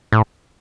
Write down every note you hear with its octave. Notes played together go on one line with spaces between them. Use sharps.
A2